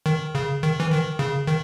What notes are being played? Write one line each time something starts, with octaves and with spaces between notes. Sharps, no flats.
D#3
C#3
D#3
E3
D#3
C#3
D#3